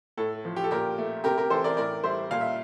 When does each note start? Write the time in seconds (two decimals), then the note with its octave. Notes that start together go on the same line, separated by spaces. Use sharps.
0.17 A2 A4
0.45 F3
0.56 G4
0.64 A4
0.71 A#2 G4 A#4
0.98 A3
1.24 C3 G4 A#4
1.38 G4 A#4
1.50 E3 A4 C5
1.64 A#4 D5
1.77 A2 A#4 D5
2.04 G3 C5 E5
2.31 A#2 F5
2.41 E5